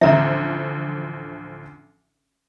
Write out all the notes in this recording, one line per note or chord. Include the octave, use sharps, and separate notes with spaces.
A1 D2 F3 E5 A#5